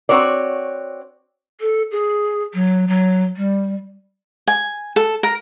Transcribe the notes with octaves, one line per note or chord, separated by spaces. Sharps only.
C4 F#4 C#5 D5
A4
G#4
F#3
F#3
G3
G#5
A4
A#4